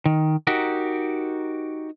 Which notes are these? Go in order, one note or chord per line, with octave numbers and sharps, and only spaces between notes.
D#3
D#4 F#4 G4 A#4